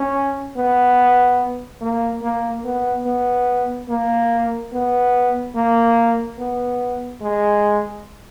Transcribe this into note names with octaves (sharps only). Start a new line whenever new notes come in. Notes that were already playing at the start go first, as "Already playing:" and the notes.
Already playing: C#4
B3
A#3
A#3
B3
B3
A#3
B3
A#3
B3
G#3